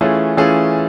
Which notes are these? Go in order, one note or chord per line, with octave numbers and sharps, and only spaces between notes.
E3 A3 C#4 F4 G#4
E3 A3 C#4 F4 G#4